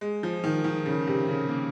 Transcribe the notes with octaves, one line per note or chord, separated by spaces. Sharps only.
G#3
F3
D#3
D#3
C#3
C3
C#3
A#3